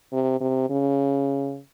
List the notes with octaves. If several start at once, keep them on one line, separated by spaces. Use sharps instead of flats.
C3
C3
C#3